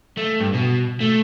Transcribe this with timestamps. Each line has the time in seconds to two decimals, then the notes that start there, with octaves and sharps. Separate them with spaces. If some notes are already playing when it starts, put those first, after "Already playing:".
0.17 A3
0.40 G2
0.53 B2
1.01 A3